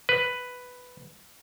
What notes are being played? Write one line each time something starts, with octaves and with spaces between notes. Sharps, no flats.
B4